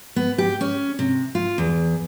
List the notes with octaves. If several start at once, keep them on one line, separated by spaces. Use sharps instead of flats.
B3
G4
C#4
C3
F4
E2